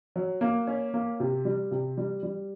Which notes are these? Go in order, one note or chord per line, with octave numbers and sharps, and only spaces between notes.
F#3
A#3
C#4
A#3
C3
G3
C3
G3
G3